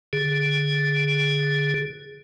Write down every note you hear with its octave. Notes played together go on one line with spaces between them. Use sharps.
D3 G#4